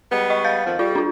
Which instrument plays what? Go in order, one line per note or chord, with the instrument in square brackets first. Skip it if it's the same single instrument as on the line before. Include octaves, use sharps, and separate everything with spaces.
[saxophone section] G3 G#3 B3
[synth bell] D#5 C#6
F5 G6 A6
[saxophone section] F2 D#3 F3
[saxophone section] G3 [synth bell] F4
[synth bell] D4 F4